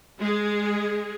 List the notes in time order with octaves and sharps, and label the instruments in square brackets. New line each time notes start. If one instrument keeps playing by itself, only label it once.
[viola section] G#3 G#4